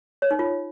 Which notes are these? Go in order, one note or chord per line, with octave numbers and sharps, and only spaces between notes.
C#5
D#4
F4